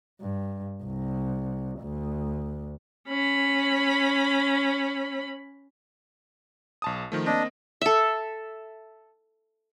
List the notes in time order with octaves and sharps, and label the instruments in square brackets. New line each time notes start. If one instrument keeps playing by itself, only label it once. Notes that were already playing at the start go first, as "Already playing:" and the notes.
[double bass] G2
C2
D2
[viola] C#4 B5
[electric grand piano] B1 A5 D#6
D#3 F3 A3
[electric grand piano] A#3 C4 [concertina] D4 [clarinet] D#5
[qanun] A4 E5